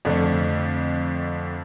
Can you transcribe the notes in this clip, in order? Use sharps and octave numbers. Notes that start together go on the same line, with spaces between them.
F2 D3 A3